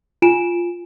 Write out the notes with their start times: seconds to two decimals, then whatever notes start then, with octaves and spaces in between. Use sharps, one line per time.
0.22 F4 G#5 D7 E7